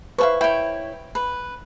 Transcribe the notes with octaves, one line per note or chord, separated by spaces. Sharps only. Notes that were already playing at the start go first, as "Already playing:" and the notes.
E4 A4 B4 C5 F5 C#6
E4 C#5 G5
B4